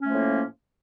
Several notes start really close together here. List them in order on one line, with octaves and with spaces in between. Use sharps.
C#4 A3 A#3 F3 A2